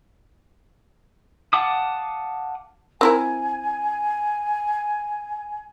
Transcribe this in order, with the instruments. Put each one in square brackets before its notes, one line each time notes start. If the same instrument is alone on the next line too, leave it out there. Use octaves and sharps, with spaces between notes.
[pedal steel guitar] F5 F#5 A5 D6 D#6
[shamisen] C4 E4 A#4 [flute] G#5